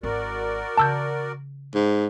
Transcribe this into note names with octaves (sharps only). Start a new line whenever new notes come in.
G#1 E4 F#4 A#4 D5
C#3 E3 A5 E6 G6
G#2